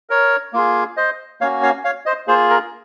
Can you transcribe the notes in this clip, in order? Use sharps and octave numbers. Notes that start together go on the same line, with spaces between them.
A#4 C#5
A#3 F4 G#4
C5 D#5
A#3 C#4 F#4 C#5 F5
C#5 F5
C#5 F5
C5 D#5
A#3 F4 G#4 C5
A#4